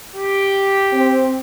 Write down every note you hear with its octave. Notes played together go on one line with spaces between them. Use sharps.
G4
C4